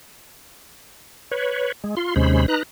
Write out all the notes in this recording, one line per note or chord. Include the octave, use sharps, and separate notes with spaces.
B4 C#5
G#3
F4 C6
D#2 C3 G#3 C#4 C5 B5
D#4 B4 A#5 F#6